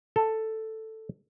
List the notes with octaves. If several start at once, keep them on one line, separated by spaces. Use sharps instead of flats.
A4